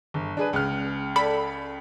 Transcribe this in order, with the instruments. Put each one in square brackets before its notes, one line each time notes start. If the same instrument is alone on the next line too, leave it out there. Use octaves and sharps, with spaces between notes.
[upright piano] G1
D4 G#4 B4
C#2 F6
[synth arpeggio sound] A4 D5 B5